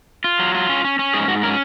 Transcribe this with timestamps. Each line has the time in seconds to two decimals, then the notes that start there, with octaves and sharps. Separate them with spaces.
0.24 F4
0.39 F#3
0.55 F4
0.69 C#4
0.84 C#4
0.99 C#4
1.13 G#2 G#4
1.28 G#2 F#4
1.43 C#4 A#4